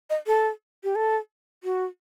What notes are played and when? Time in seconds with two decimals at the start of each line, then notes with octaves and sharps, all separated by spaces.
0.10 D#5
0.27 A4
0.84 G4
0.95 A4
1.64 F#4